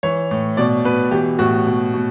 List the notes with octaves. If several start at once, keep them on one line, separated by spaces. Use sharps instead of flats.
E3 C#5
A2
B2 D5
B2 B4
E3 G4
A2 F#4
B2
B2